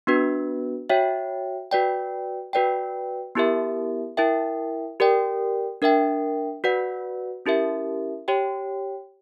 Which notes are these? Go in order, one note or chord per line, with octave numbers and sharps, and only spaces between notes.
B3 D4 F#4 B4
F#4 C#5 E5 G5
F#4 B4 D5 G5
F#4 B4 D5 G5
B3 E4 G4 A#4 E5
E4 A#4 E5 G5
G4 A#4 D5 G5
D4 A#4 E5 G5
F#4 B4 D5 F#5
C#4 E4 G4 A#4 E5
G4 C#5 G5